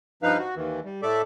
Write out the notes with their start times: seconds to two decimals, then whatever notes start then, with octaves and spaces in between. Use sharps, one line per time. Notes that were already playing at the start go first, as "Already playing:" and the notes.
0.23 G2 F3 D#4 B4 F5
0.38 F#4
0.55 D#2 D#3 E3
0.85 G3
1.02 A2 A3 A4 D5 E5 D6